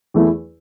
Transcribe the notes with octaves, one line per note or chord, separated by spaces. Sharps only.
E2 E3 A3 E4